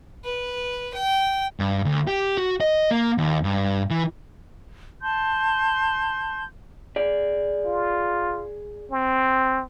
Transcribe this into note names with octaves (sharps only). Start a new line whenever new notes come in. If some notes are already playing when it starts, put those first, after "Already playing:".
B4
G5
G2
D2
G4
F#4
D#5
A#3
D#2
G2
E3
A5 C6 G6
G#4 D5
F4
C4